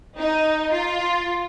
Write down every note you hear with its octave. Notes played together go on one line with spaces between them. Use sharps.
D#4
F4